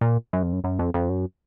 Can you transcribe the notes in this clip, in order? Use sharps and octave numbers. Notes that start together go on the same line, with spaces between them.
A#2
F#2
F2
F#2
F#2
F2
F2
F#2